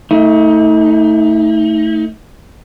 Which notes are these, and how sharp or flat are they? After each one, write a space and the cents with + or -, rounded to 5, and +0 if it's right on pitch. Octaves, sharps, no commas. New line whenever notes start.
A3 +15 D#4 +40